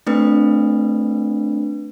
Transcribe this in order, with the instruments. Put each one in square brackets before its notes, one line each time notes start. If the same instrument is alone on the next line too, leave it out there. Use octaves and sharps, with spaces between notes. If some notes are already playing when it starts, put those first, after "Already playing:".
[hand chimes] A3 C4 D4 B4